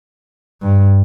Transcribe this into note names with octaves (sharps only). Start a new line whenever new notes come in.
G2